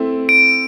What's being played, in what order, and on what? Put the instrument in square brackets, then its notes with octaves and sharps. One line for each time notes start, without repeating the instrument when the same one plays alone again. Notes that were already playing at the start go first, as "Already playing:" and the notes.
Already playing: [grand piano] A3 C4 E4
[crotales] D7